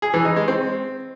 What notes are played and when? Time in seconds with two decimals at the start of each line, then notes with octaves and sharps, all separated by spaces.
0.02 G#4
0.14 E3
0.25 D#4
0.36 G#3
0.48 C4